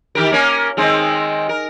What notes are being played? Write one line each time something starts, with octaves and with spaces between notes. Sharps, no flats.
D#3 G4 A#4
A#3 C#4 A#4
D#3 G#3 C4
A#4